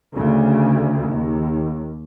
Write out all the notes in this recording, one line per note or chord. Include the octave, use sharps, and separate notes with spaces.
D2 C#3
D#2